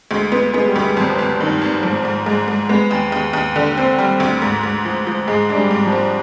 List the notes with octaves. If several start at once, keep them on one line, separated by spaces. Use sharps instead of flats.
D2 G#3
B3
G#3 B3
G3
D2
G#3
G#1 F3
G#1
G2 D#3
G#1
G#2 F3
G#2
G#2 G#3
G#2
G#3 B3
D#2
D#2
D#2
D3
C4
G3
D2
G#2
G#2
F3
F3
G#2 G#3
G#3 D4
G3
G#2
F3
G#2